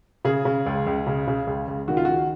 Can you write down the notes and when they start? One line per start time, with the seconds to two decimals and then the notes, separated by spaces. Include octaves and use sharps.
0.25 C#3 G#4
0.45 C#3
0.66 C#2
0.86 C#2
1.07 C#3
1.27 C#3
1.47 C#2
1.68 C#2
1.88 D#3 F#4
1.97 F4
2.05 D#3 F#4